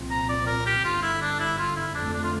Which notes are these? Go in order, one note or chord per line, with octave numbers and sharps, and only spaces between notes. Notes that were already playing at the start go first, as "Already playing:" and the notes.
Already playing: C2 A#2 F3 C4
A#5
D5
A#4
G4
G1 G2 D3 F4
E4
D4
E4
F4
E4
F2 D3 A3 D4
D4
F4